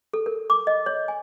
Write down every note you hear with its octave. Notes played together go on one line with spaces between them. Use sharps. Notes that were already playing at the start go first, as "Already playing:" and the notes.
A4
A#4
D6
D#5
C#5
G#5